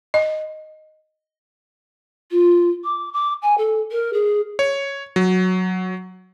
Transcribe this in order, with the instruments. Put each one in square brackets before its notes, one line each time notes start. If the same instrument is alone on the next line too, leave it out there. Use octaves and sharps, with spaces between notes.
[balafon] D#5
[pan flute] F4
D6
D6
G#5
A4
A#4
G#4
[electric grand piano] C#5
F#3